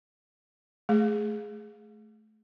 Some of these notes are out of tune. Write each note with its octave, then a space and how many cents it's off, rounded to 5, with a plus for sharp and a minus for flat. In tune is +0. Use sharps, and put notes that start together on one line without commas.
A3 -20 G#4 +0